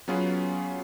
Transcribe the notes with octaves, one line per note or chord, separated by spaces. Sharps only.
F#3 B3 C#4 F4 G#4 B4